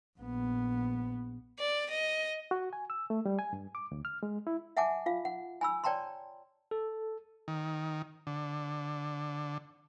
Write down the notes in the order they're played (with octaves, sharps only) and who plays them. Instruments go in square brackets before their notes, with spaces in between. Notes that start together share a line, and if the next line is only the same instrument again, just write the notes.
[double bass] A#1 B3
[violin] D5
D#5
[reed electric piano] F#4
G#5
E6
A3
G3
G#5
G2
D6
D2
F6
G#3
E4
[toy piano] E5 F#5 G#5 A5 D6
F4 F5
F#5
G#5 B5 E6
C#5 D5 G5 A5 A#5 C6
[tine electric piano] A4
[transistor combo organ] D#3
D3